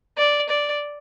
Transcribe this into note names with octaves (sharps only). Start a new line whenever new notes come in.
D5
D5